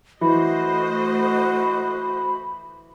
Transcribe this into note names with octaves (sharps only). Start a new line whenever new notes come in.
E3 A3 F#4 C5 D#5 B5